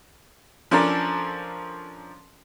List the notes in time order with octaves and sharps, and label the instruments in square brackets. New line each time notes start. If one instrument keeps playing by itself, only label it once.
[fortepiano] F3 C#4 D4 A4 A#4 D5